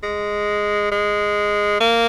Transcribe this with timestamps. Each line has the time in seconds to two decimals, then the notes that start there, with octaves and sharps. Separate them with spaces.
0.03 G#3
0.92 G#3
1.81 A#3